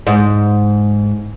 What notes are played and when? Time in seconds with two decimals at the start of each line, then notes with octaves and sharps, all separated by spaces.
0.07 G#2